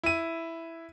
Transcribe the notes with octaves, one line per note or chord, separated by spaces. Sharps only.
E4 D#7